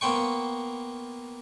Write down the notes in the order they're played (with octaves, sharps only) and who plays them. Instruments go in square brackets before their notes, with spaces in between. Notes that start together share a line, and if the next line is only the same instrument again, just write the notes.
[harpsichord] A#3 B3 C5 G5 C#6